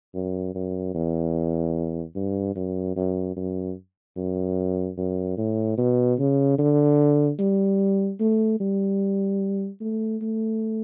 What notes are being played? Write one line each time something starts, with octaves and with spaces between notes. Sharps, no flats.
F#2
F#2
E2
G2
F#2
F#2
F#2
F#2
F#2
A2
B2
C#3
D3
G3
A3
G3
A3
A3